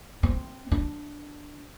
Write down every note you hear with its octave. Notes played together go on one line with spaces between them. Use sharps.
C4
D4